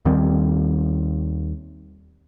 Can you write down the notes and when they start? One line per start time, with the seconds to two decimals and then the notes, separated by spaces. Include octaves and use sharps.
0.05 D#2 D#3 G3 C4